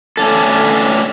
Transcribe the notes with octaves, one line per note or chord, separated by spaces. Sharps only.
A3 C#4 D4 A4